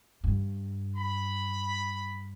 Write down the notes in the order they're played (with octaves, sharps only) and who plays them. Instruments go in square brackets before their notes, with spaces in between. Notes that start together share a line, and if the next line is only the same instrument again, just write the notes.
[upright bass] G2
[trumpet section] B5